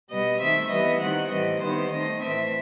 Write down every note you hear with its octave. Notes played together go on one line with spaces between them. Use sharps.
B2 G3 B3 D#5
D#3 A3 C4 E5
E3 G3 B3 D#5
D#3 G3 C4 F#5
A2 E3 G3 C4 D#5
D#3 G3 B3 C5
D#3 A3 C4 D#5
A2 E3 A3 C4 E5